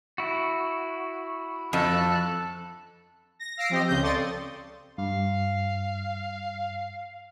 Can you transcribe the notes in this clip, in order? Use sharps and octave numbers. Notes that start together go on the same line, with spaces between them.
E4 F#4
F2 A4 F#6
A#6
F5 E6 A#6 C7 D7
F3 C4 G4 D#5 A#6
C#2 C#3 C4 G6
A4 D5 C6 C#6 D#6 A6
G2 F5